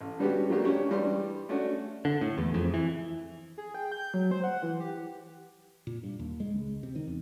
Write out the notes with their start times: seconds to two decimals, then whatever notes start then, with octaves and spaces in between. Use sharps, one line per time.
0.01 A1
0.19 D3 G3 B3 C#4 F#4 G4
0.50 F#3 A3 A#3 D4 G4
0.65 C#4 D4 G4 C#5
0.89 G2 E3 G3 D5 C6
1.49 A3 C#4 D4 F#4 D5
2.05 D3
2.21 A2
2.38 E2
2.54 F2
2.74 E3
3.58 G#4
3.74 G5
3.92 G6
4.14 F#3
4.31 C5
4.44 F#5
4.63 E3
4.80 G4
5.87 A#2
6.03 G2
6.19 D#2
6.40 G#3
6.53 C#2
6.83 C3
6.95 D#3
7.08 E2